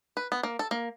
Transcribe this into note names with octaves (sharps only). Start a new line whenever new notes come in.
B4
B3
A#3
A4
A#3